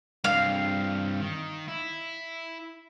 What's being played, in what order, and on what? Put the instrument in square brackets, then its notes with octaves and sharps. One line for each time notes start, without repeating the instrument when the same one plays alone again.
[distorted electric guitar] G2 C4 [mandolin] F5
[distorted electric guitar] D#3
E4